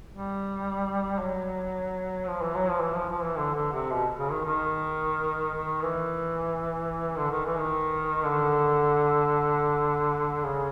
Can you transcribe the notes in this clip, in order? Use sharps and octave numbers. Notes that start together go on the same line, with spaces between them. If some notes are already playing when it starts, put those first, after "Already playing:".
G3
F#3
F3
E3
F#3
F3
E3
F3
F3
E3
D3
D3
C3
B2
C#3
D#3
D#3
D#3
E3
D3
D#3
E3
D#3
D3
C#3